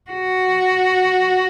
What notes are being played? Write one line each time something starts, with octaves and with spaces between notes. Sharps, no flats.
F#4